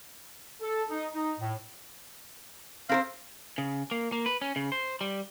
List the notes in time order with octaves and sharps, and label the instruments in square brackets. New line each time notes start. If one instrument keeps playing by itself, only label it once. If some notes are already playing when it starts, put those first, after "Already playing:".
[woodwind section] A4
D#4
D#4
A2
[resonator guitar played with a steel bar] C4 A#4 C5 [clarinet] F5
[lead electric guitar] C#3
A#3
A#3
B4
C#4
C#3
C5
G3